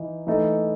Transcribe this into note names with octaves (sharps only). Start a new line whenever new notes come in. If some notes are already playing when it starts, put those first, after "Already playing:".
Already playing: E3 D#4
E3 A3 D#4 A4